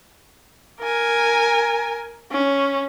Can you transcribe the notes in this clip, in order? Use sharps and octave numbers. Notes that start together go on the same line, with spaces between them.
A#4 G#5
C#4